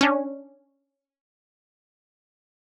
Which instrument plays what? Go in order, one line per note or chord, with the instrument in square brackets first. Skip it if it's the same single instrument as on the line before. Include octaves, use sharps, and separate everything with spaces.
[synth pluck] C#4 D4